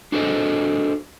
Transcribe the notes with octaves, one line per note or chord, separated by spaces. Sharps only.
D4 F#4 G#4 A4 C5 D#5